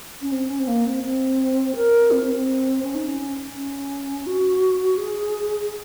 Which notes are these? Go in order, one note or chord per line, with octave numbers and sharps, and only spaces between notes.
C#4
C4
C#4
C4
A#3
C4
C4
A#4
C4
C4
C4
C#4
D#4
C#4
C#4
F#4
G#4